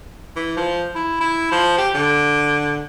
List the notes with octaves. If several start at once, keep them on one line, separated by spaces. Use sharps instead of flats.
E3
F3
E4
E4
F3
G4
D3